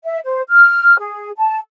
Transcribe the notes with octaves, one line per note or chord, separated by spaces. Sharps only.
E5
C5
F6
G#4
A5